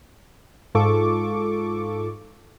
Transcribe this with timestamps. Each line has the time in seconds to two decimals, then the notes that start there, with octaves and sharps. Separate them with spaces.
0.75 G#2 F4 A4 C#6 D6